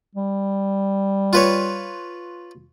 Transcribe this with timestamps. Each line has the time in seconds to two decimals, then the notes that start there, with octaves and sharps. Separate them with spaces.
0.15 G3
1.33 F4 B4 C#5